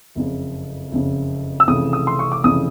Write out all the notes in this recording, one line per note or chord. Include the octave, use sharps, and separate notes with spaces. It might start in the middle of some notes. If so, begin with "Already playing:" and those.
F#1 F2 C#3
F#1 F2 C#3
E6
F1 F2 C#3 E3 D#6
D#6
C6
C#6
D6
F1 F2 C#3 E3 D#6